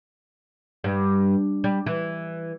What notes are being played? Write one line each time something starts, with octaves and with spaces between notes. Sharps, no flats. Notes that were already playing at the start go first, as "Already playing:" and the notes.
G2
G3
E3